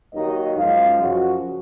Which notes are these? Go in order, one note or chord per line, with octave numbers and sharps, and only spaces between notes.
D#2 D#3 F#3 A#3 D#4 D#5
F#2 F3 G#3 D#4 F5
F#2 C#3 F3 F#4